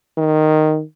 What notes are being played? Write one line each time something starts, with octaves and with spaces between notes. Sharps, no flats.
D#3